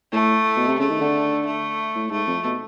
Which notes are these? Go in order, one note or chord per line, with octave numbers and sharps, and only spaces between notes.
A2 A3
B2
C3
C#3 A3
D#3
D3
A3
A2
G#2 A3
F2
B2